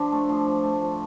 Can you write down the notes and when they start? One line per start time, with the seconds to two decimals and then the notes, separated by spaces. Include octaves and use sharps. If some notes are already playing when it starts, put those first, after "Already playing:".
Already playing: F3 D4
0.12 A3
0.29 F3
0.47 F3
0.64 A3
0.81 F3